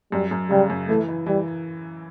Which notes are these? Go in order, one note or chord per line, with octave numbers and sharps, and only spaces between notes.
F#2 G3
F#2
C#3 G3
F#2
E3 A3
E3
E3 G3